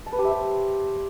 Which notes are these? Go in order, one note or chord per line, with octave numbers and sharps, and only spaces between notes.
A5
B4
G4
E5
C5